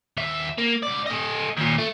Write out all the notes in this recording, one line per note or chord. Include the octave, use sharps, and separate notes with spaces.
D#2 E5
A#3
C#2 D5
A3 D#5
D#2 A#2
A3